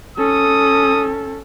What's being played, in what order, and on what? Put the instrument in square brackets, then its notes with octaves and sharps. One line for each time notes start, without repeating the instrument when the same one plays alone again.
[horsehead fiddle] C#4 A4 [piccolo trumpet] D#6